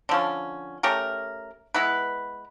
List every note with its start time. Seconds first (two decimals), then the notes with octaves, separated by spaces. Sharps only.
0.09 D3 F3 C#4
0.83 A3 C#4 G4 A#4
1.74 G#3 B3 E4 B4